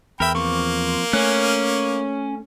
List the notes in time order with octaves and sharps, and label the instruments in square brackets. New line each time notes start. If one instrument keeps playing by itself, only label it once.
[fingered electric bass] E2 [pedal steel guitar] A#4 E5 [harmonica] G5 B5
[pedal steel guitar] F3 C4 C#6 [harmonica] A#3
[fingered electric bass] A3 [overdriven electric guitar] C#4 [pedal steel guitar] F#6